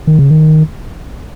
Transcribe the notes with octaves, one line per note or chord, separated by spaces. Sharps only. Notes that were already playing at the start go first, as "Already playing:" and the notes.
D#3
C#3
D#3